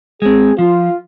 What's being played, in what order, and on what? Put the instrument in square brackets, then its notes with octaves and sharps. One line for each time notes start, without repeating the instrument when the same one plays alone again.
[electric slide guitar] G#3 C4 [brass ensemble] G#4
[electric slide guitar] F3 [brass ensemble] F4